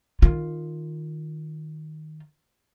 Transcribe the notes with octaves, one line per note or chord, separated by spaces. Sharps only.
D#3 F4